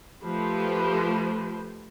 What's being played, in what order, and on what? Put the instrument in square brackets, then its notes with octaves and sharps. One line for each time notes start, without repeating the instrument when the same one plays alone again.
[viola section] F3 A3 G4 B4 C5